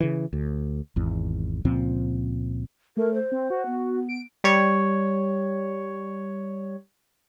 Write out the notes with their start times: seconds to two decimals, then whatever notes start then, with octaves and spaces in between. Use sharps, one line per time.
0.01 C#3 E3
0.33 D2
0.96 G#1 E2
1.65 C#2 A#2 F3 C4
2.97 A3 A#4
3.14 C5
3.32 C4
3.50 F#4
3.66 B3
4.09 D7
4.44 G3 C#5